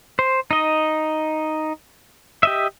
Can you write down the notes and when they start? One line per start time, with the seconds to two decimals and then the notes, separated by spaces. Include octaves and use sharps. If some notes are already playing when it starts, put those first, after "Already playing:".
0.19 C5
0.51 D#4 D#5
2.43 G4 D#5 E5